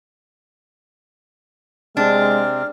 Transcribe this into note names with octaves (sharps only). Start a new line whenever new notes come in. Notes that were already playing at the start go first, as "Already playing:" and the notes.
C3 G#3 C4 D4 F6